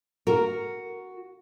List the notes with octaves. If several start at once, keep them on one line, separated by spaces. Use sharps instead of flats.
F#4 A#4